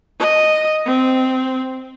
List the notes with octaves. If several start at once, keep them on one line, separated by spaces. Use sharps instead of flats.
D#5
C4